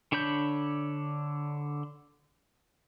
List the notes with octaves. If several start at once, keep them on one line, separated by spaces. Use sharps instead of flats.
D3 D4 C#5 B5 G6